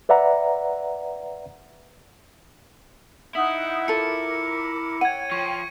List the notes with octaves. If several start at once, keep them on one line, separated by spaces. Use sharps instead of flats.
B4 D5 E5 F#5 A#5
D#4 E4 F#5 D#6
F4 A4 A#4 D6 C#7
C#5 F#5 G5 G#6 D#7
F3 C#6